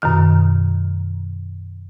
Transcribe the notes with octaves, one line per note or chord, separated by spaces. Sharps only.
F#2 B2 D#3 F6